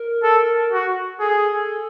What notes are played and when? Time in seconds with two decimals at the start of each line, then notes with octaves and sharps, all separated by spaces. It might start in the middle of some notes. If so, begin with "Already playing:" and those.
Already playing: A#4
0.23 A4
0.72 F#4
1.20 G#4 A4